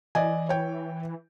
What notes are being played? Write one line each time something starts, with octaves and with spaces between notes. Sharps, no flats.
E3 D5 D#5 G#5
C#5 G5